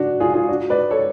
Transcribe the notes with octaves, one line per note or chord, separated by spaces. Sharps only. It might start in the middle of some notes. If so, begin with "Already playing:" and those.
Already playing: D4 F#4
F4 G#4
F4 G#4
D4 F#4
B4 D5
A4 C#5